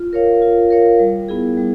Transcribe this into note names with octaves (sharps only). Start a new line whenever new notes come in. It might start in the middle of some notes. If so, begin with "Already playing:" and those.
Already playing: F4
A#4 C#5 F5
F4
A#4 C#5 F5
G3
B3 E4 G#4
G3